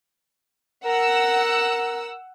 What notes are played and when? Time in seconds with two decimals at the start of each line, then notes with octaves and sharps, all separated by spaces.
0.85 A#4 F#5 E6